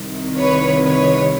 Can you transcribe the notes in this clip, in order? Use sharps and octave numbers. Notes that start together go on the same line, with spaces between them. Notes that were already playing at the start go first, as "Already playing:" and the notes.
Already playing: C2 C3 D#3
B4 C#5
B4 C#5